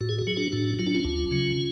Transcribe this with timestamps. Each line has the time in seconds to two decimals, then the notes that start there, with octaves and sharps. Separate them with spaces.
0.01 A2 F#4
0.09 G#4
0.19 F#4
0.27 F#3 G#4
0.36 D4 F#4
0.52 A2 D4 F#4
0.79 F#3 F4
0.87 D4
0.95 C#4 F4
1.05 D2
1.31 C#3 F#3